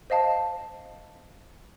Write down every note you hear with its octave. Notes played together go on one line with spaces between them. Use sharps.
C5 D#5 F5 A5